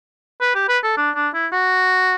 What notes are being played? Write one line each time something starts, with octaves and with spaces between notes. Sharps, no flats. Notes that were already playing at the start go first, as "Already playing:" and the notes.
B4
G4
B4
A4
D4
D4
E4
F#4